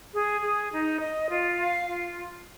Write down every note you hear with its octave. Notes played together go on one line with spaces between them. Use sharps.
G#4
G#4
D#4
D#5
F4
F5
F4